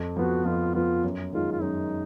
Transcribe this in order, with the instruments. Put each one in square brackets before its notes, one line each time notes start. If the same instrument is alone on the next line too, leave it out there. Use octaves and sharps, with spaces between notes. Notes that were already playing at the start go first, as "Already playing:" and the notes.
Already playing: [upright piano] F2
[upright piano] F3 B3 [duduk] F#4
[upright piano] F2 [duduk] F4
[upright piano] F3 B3 [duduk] F4
[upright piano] F#2
[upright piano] D#3 G#3 [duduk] F4
[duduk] F4
[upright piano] F#2 [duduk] D#4